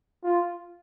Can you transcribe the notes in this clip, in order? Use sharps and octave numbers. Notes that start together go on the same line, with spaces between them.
F4